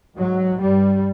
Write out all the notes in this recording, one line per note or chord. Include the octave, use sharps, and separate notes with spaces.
G#2 F#3
G2 G3